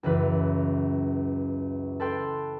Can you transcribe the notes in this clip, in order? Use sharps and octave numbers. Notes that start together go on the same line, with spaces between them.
C#2 F#2 E3 B4
A4 B4 G5 C6